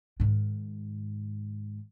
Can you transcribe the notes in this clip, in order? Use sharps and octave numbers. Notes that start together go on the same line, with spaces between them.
G#2 D#3